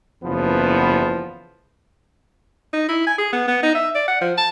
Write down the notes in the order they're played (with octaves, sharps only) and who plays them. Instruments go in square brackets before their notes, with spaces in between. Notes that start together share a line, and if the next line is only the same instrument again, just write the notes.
[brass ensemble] F#1 E2 F3 B3
[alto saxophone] D#4
E4
G#5
G#4
B3
B3
D#4
E5
D5
F#5
F3
A5